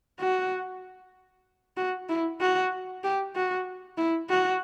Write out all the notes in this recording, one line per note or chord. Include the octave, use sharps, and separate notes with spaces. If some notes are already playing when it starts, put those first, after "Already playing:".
F#4
F#4
E4
F#4
G4
F#4
E4
F#4